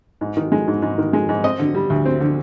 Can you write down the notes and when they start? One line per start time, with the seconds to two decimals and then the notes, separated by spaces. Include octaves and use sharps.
0.21 G#2
0.37 D#3
0.52 G#3
0.68 G#2
0.82 G#2
0.98 D#3
1.13 G#3
1.29 G#2
1.44 C4 D#5
1.59 D3
1.75 G3
1.90 D2
2.06 C4
2.20 D3